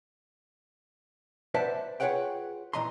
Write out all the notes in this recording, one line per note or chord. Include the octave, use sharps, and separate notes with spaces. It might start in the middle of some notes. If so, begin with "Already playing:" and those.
B4 C5 D5 E5 F#5 A5
F4 G#4 B4 C#5 F#5 G5
A#2 E3 D#5 A#5 C6